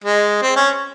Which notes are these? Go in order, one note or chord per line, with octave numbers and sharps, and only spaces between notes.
G#3
C4
C#4